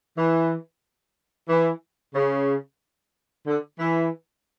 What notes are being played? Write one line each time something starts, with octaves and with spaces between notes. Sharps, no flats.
E3
E3
C#3
D3
E3